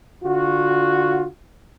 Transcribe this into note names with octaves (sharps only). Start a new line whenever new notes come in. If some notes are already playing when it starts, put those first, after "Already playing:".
D3 F4 F#4